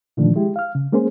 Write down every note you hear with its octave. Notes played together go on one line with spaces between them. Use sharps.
A#2 D3 D#3 F3 A3 D4
G#3 E4 G4
F5 F6
C#3
G#3 A#3 C#4 G#4 C5